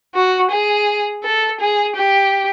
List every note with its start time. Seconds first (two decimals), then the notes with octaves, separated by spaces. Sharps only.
0.14 F#4
0.51 G#4
1.24 A4
1.60 G#4
1.96 G4